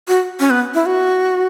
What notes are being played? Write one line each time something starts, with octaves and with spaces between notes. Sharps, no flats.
F#4
C#4
B3
E4
F#4